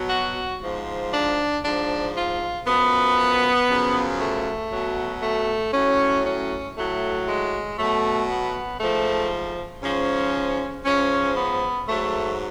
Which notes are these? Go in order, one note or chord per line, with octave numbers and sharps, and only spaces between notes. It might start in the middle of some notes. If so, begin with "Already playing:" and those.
Already playing: B2 F#3
F#4
G#2 F3
D4
G#2 F3 D4
F4
F#2 F3 B3
F#2 C#3 F3
A3
B2 F#3
A3
A2 F#3 C#4
C#4
A2 F#3 A3
G#3
B2 F#3 A3
B3
G#2 F3 A3
G#2 F3 C#4
G#2 F3 C#4
B3
G#2 F#3 A3